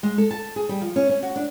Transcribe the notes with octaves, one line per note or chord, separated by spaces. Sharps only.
G#3
A4
A5
G#4
G3
F3
C#4
C#4
F#4
D4